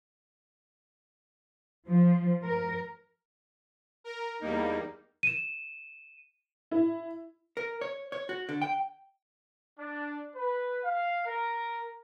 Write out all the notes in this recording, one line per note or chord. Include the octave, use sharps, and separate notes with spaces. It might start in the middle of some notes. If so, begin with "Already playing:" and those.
F3
A#4
A#4
E2 G3 A#3 D#4
D#7 E7
E4
A#4
C#5
C#5
F#4
D3
G5
D4
B4
F5
A#4